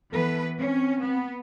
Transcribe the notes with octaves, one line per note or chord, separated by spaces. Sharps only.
E3 B3 A4 B4
C4 C#4
B3